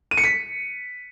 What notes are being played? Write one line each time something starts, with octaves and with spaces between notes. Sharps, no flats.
D#7
C#7
B6